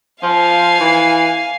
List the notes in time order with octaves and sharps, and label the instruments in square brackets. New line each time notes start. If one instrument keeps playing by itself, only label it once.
[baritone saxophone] F3 [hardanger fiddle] F5 G#5
[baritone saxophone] E3